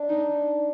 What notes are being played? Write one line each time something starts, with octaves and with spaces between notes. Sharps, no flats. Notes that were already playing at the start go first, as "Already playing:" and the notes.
Already playing: D4
D#4